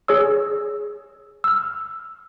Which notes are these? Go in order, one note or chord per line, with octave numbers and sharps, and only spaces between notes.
G#4 C#5 E6
E6 F6